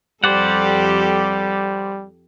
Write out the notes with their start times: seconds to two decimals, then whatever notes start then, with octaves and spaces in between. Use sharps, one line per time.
0.24 F2 G3 G4 A4 C5 D5 F#5